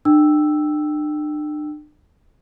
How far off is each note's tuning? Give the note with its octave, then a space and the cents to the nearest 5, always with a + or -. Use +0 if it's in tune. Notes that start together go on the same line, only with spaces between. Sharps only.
D4 +40 G5 +0 E6 +0